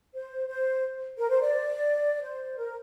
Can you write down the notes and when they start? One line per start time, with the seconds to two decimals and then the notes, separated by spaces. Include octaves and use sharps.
0.14 C5
0.48 C5
1.18 A#4
1.30 C5
1.41 D5
2.22 C5
2.57 A#4